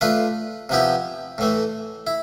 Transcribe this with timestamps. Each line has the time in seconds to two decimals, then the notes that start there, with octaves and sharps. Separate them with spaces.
0.01 A3 D4 F4 B4
0.69 C3 F3 B3 E4 G4
1.38 A2 E3 A3
2.07 E4